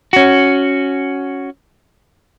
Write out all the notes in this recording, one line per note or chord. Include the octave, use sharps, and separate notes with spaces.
C#4 F#4